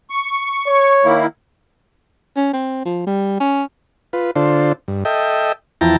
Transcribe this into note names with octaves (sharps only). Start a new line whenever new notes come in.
C#6
C#5
D#3 A#3 E4
C#4
C4
F3
G3
C#4
F4 B4
D3 D4 F4 A4 C5
G2
A4 D#5 E5 G5
E2 F3 E4 G5 A5 A#5